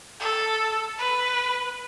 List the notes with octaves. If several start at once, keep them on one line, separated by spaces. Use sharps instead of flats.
A4
B4